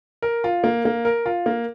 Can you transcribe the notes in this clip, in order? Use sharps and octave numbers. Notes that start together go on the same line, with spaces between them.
A#4
F4
A#3
A#3
A#4
F4
A#3